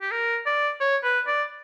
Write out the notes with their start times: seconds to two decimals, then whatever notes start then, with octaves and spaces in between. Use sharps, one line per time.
0.02 G4
0.11 A#4
0.46 D5
0.80 C#5
1.04 B4
1.27 D5